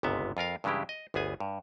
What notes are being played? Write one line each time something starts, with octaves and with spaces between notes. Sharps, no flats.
G1 C#2 G#2 C3 B3 E5
F2 F4 A#4 F5
G2 C#3 E3 G#3 E4 G4
D#5
G1 D2 B3 G#4 G#5
G2